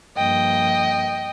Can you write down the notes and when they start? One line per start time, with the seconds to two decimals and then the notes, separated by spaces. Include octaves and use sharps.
0.17 G2 F3 A#3 D#5 G5